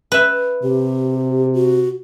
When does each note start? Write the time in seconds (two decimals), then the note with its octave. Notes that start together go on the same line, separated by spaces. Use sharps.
0.12 B4 E5
0.64 C3 G4
1.54 F#4